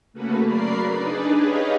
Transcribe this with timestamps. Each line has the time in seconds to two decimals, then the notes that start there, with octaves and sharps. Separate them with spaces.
0.13 C#3 A3 A#3 C#4 F#4 B4
0.44 C#3 F#3 A#4 D5 B5 C7
0.91 D4 D#4 G#4 B4 D5
1.34 G4 G#4 B4 C#5 D#5 F5